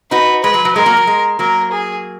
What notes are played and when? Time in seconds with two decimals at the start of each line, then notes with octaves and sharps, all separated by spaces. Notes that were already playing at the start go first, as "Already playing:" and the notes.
0.11 D#4 F#4 B4
0.43 G#3 B4
0.54 F#3
0.65 F#3
0.75 G#3 A#4
0.86 F#3 A#3
0.97 F#3
1.07 G#3
1.39 F#3 A#3 A#4
1.72 G#4